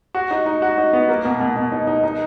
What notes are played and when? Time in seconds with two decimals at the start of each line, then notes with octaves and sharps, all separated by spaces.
0.15 F#4
0.31 D#4
0.46 D#4
0.62 F#4
0.78 D#4
0.93 B3
1.09 A#3
1.25 B2
1.40 B2
1.57 B2
1.72 D#4
1.87 D#4
2.03 D#4